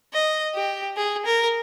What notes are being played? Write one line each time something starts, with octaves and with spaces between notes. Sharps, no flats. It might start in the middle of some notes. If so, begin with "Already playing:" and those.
D#5
G4
G#4
A#4